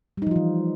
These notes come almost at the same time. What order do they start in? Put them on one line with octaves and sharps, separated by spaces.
G3 D#4 F3 F4 E3